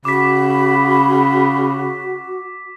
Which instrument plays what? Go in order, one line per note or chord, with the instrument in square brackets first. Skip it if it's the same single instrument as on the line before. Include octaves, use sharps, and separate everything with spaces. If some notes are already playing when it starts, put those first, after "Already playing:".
[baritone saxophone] C#3 [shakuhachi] F#4 [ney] B5 [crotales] D6 B6